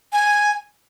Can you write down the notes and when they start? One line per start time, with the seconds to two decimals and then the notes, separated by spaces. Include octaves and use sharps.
0.13 G#5